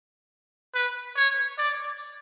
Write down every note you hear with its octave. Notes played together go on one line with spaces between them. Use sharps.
B4
C#5
D5